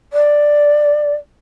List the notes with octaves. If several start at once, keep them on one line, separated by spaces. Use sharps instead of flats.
D5